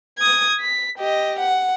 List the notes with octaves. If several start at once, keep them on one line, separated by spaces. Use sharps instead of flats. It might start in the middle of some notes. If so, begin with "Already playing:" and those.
D#6 G#6
B6
G4 D#5
F#5